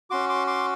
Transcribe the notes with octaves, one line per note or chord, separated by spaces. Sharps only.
C#4 F#4 C6 D6
C6 D6
C6 D6